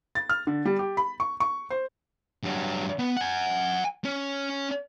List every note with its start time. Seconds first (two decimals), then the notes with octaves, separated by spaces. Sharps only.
0.15 A6
0.29 F6
0.47 D3
0.65 G3
0.79 G4
0.97 B5
1.20 C#6
1.40 C#6
1.70 C5
2.43 G2 F#3
2.99 B3
3.17 F#5 G#5
4.05 C#4